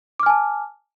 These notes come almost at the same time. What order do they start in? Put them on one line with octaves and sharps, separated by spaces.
D6 F6 G#5 A5